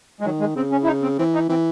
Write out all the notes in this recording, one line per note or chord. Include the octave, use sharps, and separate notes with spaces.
G#3
D#3 F#3
G#3
C#3 C4
C#4
E4
D#4
C4
E3 C4
D#4
E3 C4